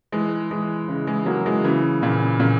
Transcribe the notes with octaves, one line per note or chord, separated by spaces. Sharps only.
E3 G#3
E3 G#3
C#3 E3
E3 G#3
F#3 A#3
E3 G#3
C#3 E3
A#2 C#3
A#2 C#3